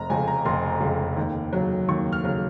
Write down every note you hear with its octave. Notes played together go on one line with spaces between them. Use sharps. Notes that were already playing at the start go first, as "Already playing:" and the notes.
Already playing: F1 A#5
F2 C#3 G#5
A#5
F1 C6
F2 C#3
D#2
C#3 F#3
D#2 C#6
F6
C#3 F#3